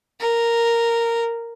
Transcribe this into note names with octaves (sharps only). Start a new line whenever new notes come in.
A#4